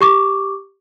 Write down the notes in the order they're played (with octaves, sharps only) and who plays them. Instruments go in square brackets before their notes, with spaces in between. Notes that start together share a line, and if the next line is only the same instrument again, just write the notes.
[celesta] G4 C#6 D6